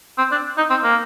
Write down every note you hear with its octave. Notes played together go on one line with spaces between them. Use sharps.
C4
D4
D#4
C4
A#3